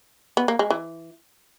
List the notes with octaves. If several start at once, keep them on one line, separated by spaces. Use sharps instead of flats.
B3
A#3
G#3
E3